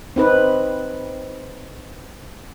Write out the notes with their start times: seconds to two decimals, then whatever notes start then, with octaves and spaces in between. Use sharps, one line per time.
0.16 C4 D#4 B4